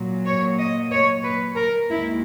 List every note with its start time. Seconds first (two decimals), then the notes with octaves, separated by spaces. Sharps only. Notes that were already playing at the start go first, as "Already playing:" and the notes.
Already playing: A#2 F#3
0.25 C#5
0.58 D#5
0.91 C#5
1.24 B4
1.56 A#4
1.89 D#2 D#3 G#3 E4